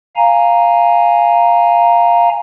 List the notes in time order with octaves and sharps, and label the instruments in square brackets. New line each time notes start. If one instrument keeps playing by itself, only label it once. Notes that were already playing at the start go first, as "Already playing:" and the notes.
[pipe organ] F5 G#5 A#5